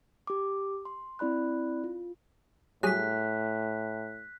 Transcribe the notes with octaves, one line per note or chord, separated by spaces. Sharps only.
G4 D6
C6
C4 E4 D5 B5 F#6
F4
A2 F#3 G3 G#4 F#6 B6